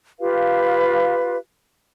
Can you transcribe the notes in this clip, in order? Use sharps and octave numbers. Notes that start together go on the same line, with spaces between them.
F4 G4 B4 F5